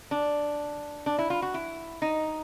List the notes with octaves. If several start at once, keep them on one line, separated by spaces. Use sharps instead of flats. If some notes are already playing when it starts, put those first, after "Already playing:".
D4
D4
E4
F4
F#4
E4
D#4